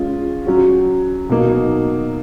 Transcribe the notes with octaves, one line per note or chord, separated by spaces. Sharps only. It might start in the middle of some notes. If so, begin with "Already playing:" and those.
Already playing: G#3 C#4 F4
F#3 C#4 F#4
B2 F#3 A#3 D#4